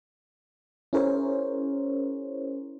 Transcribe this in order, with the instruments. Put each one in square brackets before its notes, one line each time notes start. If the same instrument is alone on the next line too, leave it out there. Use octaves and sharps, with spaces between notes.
[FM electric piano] C#4 E4 G#4 A#4 C5 C#5